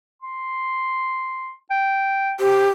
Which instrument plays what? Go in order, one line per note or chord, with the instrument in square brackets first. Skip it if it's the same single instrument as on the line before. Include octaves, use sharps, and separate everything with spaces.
[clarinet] C6
G5
[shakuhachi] G4 [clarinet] C5